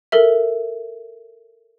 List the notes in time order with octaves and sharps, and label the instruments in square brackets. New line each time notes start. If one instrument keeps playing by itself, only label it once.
[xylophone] A4 A#4 E5